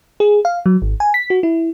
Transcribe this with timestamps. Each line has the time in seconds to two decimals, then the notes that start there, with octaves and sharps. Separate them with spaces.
0.20 G#4
0.45 F5
0.66 F#3
0.82 G#1
1.00 G#5
1.14 B6
1.30 F#4
1.43 E4